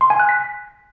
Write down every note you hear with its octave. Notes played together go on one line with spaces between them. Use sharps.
C6
G#5
F#6
B6